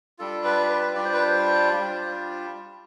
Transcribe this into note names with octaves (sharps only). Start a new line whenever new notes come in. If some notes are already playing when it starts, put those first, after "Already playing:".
G3 D4 F4 A4
B4
B4
G3 D4 F4 D5
C5
B4
C5
G3 D4 F4